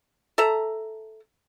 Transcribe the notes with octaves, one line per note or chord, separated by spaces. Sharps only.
A4 E5 A#5